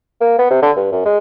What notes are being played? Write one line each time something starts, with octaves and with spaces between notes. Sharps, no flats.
A#3
B3
C3
D3
G2
F#2
G#3